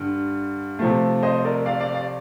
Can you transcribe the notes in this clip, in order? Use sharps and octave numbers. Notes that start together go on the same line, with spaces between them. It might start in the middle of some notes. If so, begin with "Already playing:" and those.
Already playing: G2 D3
C3 F3 A3
C5 D#5
A#4 D5
D5 F5
D5 F5
D5 F5